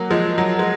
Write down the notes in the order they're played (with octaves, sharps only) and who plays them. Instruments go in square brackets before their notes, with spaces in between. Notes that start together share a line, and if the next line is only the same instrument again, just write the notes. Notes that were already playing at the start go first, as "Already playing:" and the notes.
Already playing: [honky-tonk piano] F#3 A#3
F3 G#3
F#3
G#3